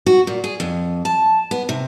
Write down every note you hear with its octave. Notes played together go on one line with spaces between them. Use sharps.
F#4
A#2
G#4
F2
A5
B3
C3